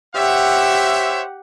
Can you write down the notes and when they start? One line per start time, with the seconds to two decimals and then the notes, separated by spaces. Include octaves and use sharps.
0.16 G4 C5 C#5 E5 F#5